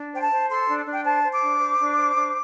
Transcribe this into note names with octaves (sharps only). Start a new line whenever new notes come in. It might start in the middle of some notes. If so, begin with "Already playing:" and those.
Already playing: D4
C5 G5
A5
C5
A4 C6
D4
D4
G5
C5 A5
C5
D6
D4
C5
D4
C5
D4